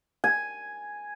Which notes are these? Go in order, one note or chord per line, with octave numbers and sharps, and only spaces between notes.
G#5